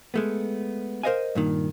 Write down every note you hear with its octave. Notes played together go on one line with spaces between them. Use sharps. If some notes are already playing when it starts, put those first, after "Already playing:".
G#3 A3 B3
A#4 C5 C#5 D#5 F5 G#5
G2 A#2 D#3